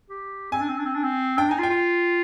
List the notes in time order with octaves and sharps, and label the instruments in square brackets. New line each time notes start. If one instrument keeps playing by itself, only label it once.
[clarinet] G4
[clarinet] C4 [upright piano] G#5
[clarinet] D4
C4
D4
C4
D4
C4
[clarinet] D4 [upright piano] G5
[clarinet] D#4 [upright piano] G#5
[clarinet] F4
[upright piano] G5
[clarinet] F4